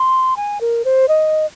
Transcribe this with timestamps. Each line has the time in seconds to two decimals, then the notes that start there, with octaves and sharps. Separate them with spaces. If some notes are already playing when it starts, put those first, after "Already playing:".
Already playing: C6
0.37 G#5
0.61 A#4
0.85 C5
1.08 D#5